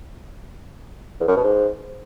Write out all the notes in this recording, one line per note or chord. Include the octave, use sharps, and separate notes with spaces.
E2
F#2
B2
G#2